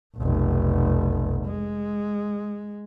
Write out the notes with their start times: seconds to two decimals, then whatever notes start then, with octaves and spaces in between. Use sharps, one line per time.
0.16 F1 B1
1.46 G#3